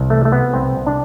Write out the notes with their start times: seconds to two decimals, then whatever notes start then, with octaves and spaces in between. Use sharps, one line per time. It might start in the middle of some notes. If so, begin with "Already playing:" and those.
Already playing: C2
0.10 E3 A3
0.25 A3
0.32 C3 B3
0.54 C2 C4
0.76 C2
0.87 D4